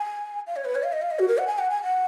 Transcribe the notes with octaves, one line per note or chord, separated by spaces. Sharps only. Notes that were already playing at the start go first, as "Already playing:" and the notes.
Already playing: G#5
F5
C#5
B4
C#5
F5
D#5
F5
D#5
F#4
A#4
F#5
G#5
F#5
G#5
F#5